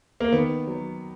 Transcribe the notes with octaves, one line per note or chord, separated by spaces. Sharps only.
A#3
D#3 B3
F#3